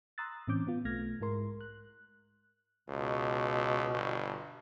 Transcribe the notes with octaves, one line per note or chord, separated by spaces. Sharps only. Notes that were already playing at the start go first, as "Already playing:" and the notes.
A#5 C6 D#6 E6 F#6 A6
A2 E3 C4 C#4 D6 G6
B3 F4
B1 A3 F6 G#6 A#6
G#2 G#3 E4 A#4 C6
F#6
C#2 B2
G1